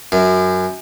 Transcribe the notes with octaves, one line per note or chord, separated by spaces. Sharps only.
F#2